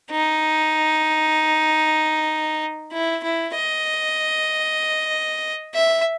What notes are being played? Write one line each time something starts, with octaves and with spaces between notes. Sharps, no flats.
D#4
E4
E4
D#5
E5